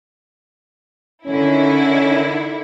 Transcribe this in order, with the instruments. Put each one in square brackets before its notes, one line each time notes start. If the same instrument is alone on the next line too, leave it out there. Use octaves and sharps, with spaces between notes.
[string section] D3 D#3 E4 [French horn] C#4